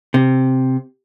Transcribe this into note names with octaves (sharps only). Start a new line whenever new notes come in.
C3